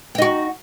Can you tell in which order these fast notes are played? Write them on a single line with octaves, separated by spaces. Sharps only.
G4 D#4 F#4